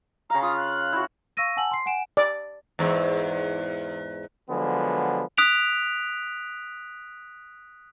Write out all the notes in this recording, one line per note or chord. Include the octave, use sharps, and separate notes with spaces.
C#3 F5 A#5
F4 D#6
F#6
E4 F#4
F5 C#6 E6 A#6 D#7
F#5 G#5 A5 E6 F#7
C6 C7
F#5 G#5 D7 E7
D5
E2 G#2
D3 F3 F#3 G#3 B3
D#6 F#6 B6 D7 F7